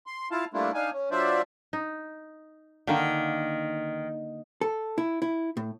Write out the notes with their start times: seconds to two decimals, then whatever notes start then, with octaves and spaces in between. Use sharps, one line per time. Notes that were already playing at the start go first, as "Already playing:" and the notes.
0.06 C6
0.31 E4 F4 F5 A5
0.54 G3 A3 A#3 D4 E4 F4
0.74 D4 D#4 F5 G#5
0.93 C#4
1.11 F#3 D4 F4 C5 D5 E5
1.73 D#4
2.87 D3 D#3 A#3
4.61 A4
4.98 E4
5.22 E4
5.57 A2